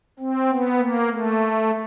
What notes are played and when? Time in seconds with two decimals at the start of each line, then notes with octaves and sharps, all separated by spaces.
0.19 C4
0.50 B3
0.78 A#3
1.08 A3